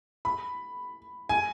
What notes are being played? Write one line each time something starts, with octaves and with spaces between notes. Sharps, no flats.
B5
G#5